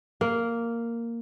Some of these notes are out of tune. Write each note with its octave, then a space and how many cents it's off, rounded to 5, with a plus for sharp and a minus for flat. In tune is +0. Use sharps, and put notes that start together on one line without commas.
A#3 -5